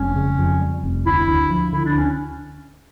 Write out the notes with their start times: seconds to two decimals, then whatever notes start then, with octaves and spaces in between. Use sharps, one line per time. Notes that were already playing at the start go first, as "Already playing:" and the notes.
Already playing: F1 G3 C#4
0.16 C#3
0.38 F2
0.61 G3
0.83 F1
1.06 D2 E4
1.28 D2
1.50 F3
1.73 D3 E4
1.85 D4
1.95 D2 C#4